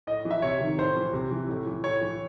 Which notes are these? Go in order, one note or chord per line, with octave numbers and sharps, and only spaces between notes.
A2 D#5
E3
E5
C3 C#5
D#3
A2 C5
E3
C3
E3
A2
E3
A2 C#5
E3